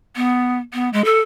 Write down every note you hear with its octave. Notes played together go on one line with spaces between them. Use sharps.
B3
B3
G#3
A4